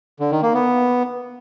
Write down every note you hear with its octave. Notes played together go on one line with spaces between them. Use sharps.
D3
D#3
A#3
B3